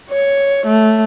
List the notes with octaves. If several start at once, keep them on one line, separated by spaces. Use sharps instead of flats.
C#5
A3